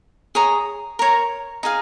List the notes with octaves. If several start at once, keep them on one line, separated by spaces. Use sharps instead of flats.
G#4 C#5 A#5 D#6
A#4 C#5 A#5
D#4 G#4 F5